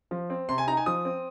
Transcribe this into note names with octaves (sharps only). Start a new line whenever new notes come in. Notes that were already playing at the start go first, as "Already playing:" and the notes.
F3
C4
C3 C6
G#5
D#4 A#5
G#5
F3 D#6
C4